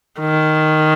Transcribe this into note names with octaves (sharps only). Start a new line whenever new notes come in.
D#3